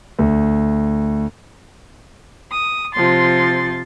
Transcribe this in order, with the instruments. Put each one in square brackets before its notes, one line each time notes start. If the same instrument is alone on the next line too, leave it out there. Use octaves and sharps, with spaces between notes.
[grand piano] D2
[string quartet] D#6
C3 F3 C6 A6